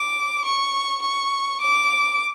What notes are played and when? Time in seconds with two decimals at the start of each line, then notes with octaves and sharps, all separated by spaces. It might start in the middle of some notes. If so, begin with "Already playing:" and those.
Already playing: D6
0.45 C#6
1.02 C#6
1.60 D6